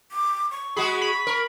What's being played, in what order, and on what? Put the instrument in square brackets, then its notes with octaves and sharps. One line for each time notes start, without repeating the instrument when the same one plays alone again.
[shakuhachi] D6
C#6
[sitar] G#3 F#4 G#4 [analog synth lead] B5
[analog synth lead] B5
[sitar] A#4